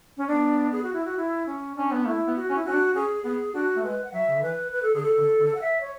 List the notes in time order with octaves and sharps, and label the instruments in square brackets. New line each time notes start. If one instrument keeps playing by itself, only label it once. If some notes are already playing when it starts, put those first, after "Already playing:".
[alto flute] C#4
[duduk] B3 [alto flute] D4
[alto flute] G#4
F#4
E4
F#4
E4
C#4
[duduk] C#4 [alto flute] D4
[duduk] B3
[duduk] A3 [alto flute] E4
[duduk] B3
[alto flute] F#4
[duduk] C#4
[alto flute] E4
[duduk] C#4 [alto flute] F#4
[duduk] D4
[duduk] C#4 [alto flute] G#4
[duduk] B3 [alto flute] G#4
[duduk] D4 [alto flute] F#4
[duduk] A3
[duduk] G#3 [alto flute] B4
[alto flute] F#5
[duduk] F#3 [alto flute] E5
[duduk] C#3
D3
[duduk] E3 [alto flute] B4
[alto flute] B4
A4
[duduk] D3 [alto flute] G#4
[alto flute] A4
[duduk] D3
D3
[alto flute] F#5
E5
C#5